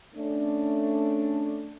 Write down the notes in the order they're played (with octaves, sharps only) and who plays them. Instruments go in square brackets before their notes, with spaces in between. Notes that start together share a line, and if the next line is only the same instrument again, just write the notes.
[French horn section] A3 C#4 D4